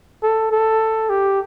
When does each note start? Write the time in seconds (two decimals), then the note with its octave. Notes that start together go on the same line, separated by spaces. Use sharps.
0.23 A4
0.51 A4
1.09 G4